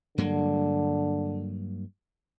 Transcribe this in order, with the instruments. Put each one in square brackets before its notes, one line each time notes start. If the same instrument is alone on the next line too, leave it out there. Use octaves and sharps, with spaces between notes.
[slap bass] G2 F#3 A#3 [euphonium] D3